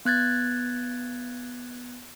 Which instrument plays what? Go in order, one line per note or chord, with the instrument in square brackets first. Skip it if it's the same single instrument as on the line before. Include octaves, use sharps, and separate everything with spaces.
[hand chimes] B3 F#6 G#6 A6